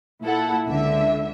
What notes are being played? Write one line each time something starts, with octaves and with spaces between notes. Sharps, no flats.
A#2 E4 A4 F#5
C#2 D3 E5